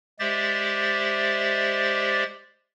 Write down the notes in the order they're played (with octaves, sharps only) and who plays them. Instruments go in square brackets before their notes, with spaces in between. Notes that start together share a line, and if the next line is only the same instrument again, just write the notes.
[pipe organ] G#3 G4 C5 D5 E5 A6